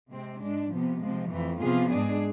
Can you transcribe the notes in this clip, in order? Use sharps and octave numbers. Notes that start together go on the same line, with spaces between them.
C3 G#3 C4
G#2 G#3 D4
C3 F3 B3
C3 F3 G#3
F2 E3 A3
C3 F3 B3 F4 G#4
G#2 G#3 D4 G#4